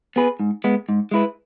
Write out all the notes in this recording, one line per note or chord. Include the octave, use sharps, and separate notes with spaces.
B3 G#4 B4
G#2
G#3 B3
G#2
G#3 E4 B4